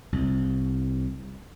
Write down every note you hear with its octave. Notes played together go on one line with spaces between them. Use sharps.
C2